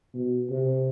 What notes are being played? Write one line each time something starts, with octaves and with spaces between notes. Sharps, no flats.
B2
C3